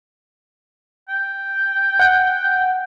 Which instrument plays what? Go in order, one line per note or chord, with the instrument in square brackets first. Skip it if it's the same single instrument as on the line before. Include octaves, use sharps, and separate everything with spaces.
[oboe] G5
[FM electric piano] F#5 G6